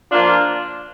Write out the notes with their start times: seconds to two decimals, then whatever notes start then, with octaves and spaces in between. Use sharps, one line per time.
0.12 F3 A#3 D4 F4